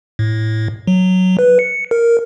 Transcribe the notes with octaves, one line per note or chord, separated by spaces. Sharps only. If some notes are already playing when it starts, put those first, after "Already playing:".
A2
F#3
B4
C#7
A#4